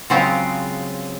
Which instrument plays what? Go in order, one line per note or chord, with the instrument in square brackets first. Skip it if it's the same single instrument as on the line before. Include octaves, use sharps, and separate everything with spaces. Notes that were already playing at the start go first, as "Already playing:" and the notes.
[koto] C#3 F#3 G#3 C4 F4